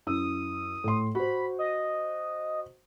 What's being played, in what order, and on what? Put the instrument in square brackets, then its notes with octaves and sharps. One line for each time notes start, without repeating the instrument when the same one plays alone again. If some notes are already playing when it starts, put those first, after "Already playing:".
[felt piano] F#2 E4 E6 [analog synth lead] D#6
[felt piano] A2 C6
[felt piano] F#4 C5 [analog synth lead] B5
[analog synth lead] D#5